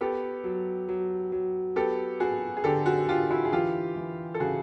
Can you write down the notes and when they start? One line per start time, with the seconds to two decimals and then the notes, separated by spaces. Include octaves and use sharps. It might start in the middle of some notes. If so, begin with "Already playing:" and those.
0.01 B3 G4 A4
0.44 F#3
0.89 F#3
1.32 F#3
1.76 B3 G4 A4
2.20 B3 F#4 G#4
2.57 G#4
2.64 D3 G4 A4
2.86 F#4 G#4
3.08 D3 F4 G4
3.30 E4 F#4
3.45 G#4
3.52 E3 F4 G4
3.96 E3
4.34 A4
4.40 C#3 F#4 G#4